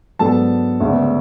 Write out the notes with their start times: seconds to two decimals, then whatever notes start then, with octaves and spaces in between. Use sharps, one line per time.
0.19 G#2 F#3 B3 D4 A4 A5
0.80 D2 C#3 G#3 B3 D4